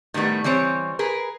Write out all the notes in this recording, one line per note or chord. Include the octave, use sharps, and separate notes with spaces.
A2 D#3 G3 A3 B3
E3 G3 C4 C#5
G#4 A#4 B4